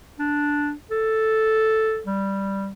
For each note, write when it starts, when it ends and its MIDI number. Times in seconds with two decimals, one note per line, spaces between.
0.19 0.72 62
0.91 2.01 69
2.06 2.73 55